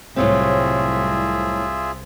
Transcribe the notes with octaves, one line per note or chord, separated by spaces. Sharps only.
C2 A2 F#3 C4 F4 G#4 E5